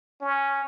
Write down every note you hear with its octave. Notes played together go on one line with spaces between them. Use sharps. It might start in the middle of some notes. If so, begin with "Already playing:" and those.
C#4